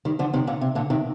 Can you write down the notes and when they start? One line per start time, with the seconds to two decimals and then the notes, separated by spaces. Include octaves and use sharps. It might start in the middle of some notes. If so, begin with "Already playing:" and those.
0.05 D#3 G3
0.19 D3 F3
0.33 C3 D#3
0.47 A#2 D3
0.61 C3
0.75 A#2 D3
0.90 C3 D#3